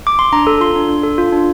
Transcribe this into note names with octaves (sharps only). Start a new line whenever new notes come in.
D6
C6
D4 A#5
A4
F4 C6
D4
D4
A4
F4
D4